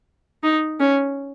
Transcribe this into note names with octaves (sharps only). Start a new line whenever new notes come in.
D#4
C#4